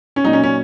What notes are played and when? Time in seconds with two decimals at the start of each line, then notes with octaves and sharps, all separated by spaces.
0.16 C#4
0.24 A#2 F#3 D#4
0.33 C#4
0.44 C#4